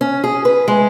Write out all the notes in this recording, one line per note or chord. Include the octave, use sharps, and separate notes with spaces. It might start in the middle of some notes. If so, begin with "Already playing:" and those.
C#4
G#4
B4
G#3